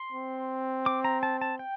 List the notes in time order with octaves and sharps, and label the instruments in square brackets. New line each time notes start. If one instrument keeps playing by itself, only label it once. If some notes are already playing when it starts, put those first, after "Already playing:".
Already playing: [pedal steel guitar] C6
[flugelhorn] C4
[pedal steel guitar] D6
A#5
A5
A5
G5